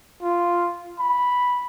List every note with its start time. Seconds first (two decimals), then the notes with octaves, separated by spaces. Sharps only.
0.22 F4
0.99 B5